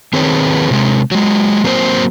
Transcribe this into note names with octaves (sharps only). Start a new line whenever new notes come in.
D#3 C4 G#4 B4 C#5
C3 G#3
F#3 G#3
F#3 A#3 C4 D4 C5